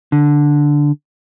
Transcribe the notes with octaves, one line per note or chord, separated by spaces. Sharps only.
D3